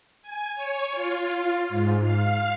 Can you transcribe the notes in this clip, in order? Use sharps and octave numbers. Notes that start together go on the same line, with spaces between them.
G#5
C#5
F4
F4
G#2
F5